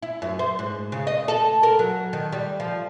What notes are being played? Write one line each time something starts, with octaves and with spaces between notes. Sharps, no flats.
E4
F#2
C5
G#2
C#3
D#5
A4
A#4
F#3
D#3
G3
F3